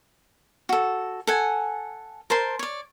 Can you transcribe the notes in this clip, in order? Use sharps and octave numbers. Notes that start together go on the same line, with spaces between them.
F#4 A4
A4 F#5 G#5
A#4 C5 A5 C6
C#5 D5